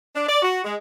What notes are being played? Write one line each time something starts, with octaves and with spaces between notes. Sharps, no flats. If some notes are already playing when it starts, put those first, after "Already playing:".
D4
D5
F#4
G#3